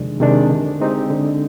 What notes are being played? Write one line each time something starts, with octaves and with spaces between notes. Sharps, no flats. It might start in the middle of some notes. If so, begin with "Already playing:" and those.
Already playing: F2 C3 D#3 G#3 D4
C3 D#3 G#3 D4
D3
G#3 C4 D#4 G4
D3